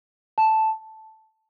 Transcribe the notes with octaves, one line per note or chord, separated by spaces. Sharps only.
A5